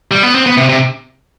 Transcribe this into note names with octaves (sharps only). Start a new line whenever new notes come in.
G3
B3
C4
B3
C3
C3